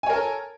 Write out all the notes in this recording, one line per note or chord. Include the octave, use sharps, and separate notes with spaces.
A4 A#4 C#5 G#5